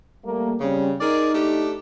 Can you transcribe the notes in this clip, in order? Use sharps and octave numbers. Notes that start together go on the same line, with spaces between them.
G3 A3 A#3
C#3 G3 C4 C#4
D#4 G#4 A#4 D5
A3 D4 G4